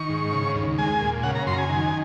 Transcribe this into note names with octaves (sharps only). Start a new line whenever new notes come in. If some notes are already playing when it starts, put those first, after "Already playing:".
Already playing: D#3 C#6
G#2
C#3
D#2
G#3 G#5
A#2
C#3 F#5
A#5
F#2 C6
A#5
G#5
D#3